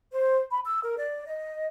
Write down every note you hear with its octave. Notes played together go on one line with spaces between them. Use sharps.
C5
B5
E6
A#4
D5
D#5